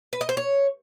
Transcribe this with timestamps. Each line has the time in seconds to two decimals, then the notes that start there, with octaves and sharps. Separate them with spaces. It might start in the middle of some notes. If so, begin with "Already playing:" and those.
0.13 B4
0.21 D#5
0.29 C5
0.37 C#5